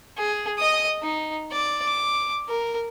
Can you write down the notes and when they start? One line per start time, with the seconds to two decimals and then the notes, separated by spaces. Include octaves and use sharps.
0.18 G#4
0.58 D#5 D#6
1.03 D#4
1.52 D5
1.85 D6
2.49 A#4